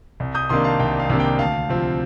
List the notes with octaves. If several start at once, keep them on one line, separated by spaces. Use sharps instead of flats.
C2
D#6 G6
C3 D#3 A#3 D4 C6 D#6
F5 A5
C2 G5
F5
C3 D#3 A#3 D4
G5
D2 F5 A5
C3 F3 C4